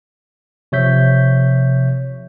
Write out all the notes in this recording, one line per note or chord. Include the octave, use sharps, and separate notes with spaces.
C3 F3 C#5 E5 G6 B6